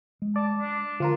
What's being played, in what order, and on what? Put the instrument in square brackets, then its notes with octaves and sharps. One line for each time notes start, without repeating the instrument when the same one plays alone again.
[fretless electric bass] G#3
[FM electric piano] D5 [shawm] A5
[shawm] D4
[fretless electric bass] D3 [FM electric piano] F3 F4 A#4